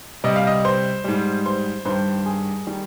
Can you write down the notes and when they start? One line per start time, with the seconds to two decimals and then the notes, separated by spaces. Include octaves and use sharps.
0.24 C3 G3 D#5
0.36 F5
0.47 D#5
0.65 C5
1.04 G#2 G3
1.46 C5
1.85 G2 D#3 G3 C5
2.26 G#4
2.67 D#3 G3